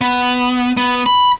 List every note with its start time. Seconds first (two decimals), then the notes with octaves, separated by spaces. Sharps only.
0.01 B3
0.77 B3
1.06 B5